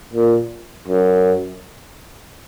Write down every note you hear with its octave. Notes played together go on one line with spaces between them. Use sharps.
A#2
F#2